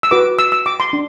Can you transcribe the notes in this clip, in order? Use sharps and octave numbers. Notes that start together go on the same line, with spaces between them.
E6
F#4 B4 D6
E6
E6
D6
C6
D4